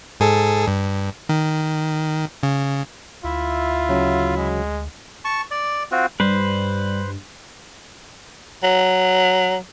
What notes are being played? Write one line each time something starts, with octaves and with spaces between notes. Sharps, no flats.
G#2 G#4 A4
G2
D#3
C#3
D2 E4 F4 E5
C#3 F#3
G#3
A5 C#6
D5
C4 F4 F#4
G2 G3 B4 C5
F#3